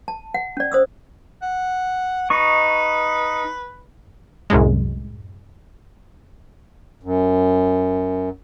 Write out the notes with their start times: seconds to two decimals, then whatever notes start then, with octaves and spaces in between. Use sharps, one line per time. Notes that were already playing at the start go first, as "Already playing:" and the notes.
0.08 A5
0.34 F#5
0.57 C#4 D5
0.72 C5 D#6 E6
1.42 F#5
2.30 D#4 B4 C#6
4.50 C2 F#2 A2 G#3
7.03 F#2